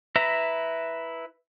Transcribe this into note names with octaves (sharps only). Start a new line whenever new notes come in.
E4 B4 E5 A#5